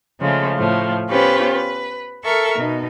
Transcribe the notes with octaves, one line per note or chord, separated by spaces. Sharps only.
C#3 F3 G#3 A3
A2 F3 A3
B3 C#4 F4 G4 B4 C5
B4
A4 A#4 E5 C#6
B2 D#4